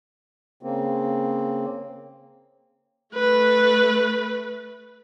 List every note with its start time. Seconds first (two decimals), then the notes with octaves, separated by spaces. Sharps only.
0.63 C#3 A#3 C4
3.15 A3 B4